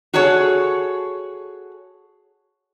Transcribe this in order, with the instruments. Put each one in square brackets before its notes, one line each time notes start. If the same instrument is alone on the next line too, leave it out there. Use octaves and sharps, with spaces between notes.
[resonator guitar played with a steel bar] F#4 G#4 A4 C#5